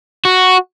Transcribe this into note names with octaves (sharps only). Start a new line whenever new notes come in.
F#4